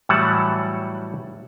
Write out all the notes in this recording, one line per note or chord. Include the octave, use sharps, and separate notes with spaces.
A2 E3 F#3 G3 F#5 A5